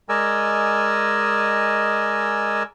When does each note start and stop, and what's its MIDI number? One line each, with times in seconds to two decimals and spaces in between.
0.09 2.63 56
0.09 2.63 70
0.09 2.63 74
0.09 2.63 75
0.09 2.63 80
0.09 2.63 88